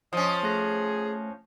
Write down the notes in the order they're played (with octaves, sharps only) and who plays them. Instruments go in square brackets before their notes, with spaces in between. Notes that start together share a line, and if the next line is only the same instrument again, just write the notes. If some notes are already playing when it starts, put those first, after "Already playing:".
[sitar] F3 C#4 [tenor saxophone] D#5
[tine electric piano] A3 F#6 A#6 [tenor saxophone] G#4